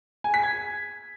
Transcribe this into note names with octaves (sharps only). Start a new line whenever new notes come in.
G#5
B6
G#6